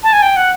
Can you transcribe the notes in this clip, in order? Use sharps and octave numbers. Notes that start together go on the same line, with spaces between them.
A5
G#5
G5
F#5